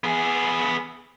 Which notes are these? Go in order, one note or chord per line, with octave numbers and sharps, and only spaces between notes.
B3 G#4